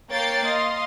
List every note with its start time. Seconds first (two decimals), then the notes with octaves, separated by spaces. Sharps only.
0.10 A#3 C#5 G5 G6 A6 C7
0.45 D#5 F5 C6